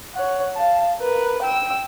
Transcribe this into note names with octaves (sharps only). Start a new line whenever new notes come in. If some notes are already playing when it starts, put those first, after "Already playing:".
C#5 F#5
F5 A5
A#4 B4
G5 E6